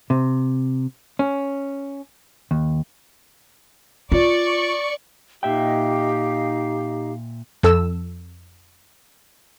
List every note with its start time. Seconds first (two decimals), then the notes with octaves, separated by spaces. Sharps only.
0.10 C3
1.19 C#4
2.51 D#2
4.12 F4 D5 C#6
5.43 A#2 D#4 G4 E5 F5 G5
7.63 F2 A4 E6